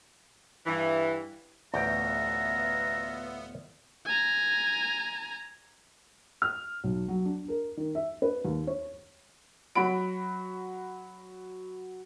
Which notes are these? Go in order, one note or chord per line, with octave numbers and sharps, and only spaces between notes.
G2 E3
A1 D2 B3 F4 B4 E5 G5 A#5
G#5 A#5
F6
B1
F#3
D4
A#4
D#3
E5
B4
D#2
C#5
F#3 F#4 B5 D7